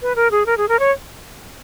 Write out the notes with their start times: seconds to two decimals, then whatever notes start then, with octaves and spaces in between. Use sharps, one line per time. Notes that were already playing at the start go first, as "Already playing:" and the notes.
0.02 B4
0.16 A#4
0.31 G#4
0.46 A#4
0.57 G#4
0.68 A#4
0.79 C#5